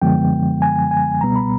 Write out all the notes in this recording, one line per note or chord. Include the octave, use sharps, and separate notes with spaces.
F#2 D3 F3 G#3 B3 G5
G#5
G#5
C#2 B2 G3 B3 A#5
B5